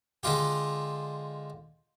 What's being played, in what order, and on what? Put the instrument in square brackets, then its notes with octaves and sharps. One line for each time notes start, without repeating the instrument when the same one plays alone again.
[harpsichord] D3 G#3 F4 G4